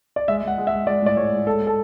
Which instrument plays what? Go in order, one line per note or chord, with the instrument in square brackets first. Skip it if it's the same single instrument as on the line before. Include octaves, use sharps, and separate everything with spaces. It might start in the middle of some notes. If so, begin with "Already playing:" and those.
[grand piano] D5
G#3 E5
G#3
F#5
G#3
E5
G#3
G#3 D5
A2 D5
G#3 C#5
G#3
G#3 A4
G#3
A4